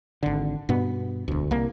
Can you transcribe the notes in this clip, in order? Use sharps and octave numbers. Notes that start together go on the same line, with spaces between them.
G#1 D3
G2 B2 B3
E1 D2
C2 A#3